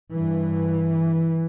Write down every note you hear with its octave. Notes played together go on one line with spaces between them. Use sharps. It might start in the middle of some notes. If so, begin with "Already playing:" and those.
G2 E3